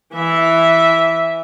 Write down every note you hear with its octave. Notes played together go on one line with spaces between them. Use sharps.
E3 E5